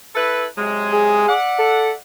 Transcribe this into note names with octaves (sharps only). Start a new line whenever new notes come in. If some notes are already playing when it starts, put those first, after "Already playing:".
E4 A4 B4
C3 F#3 G#3
G#4
D5 E5 F#5
A4